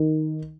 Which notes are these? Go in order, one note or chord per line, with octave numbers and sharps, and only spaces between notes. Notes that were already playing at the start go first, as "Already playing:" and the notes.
Already playing: D#3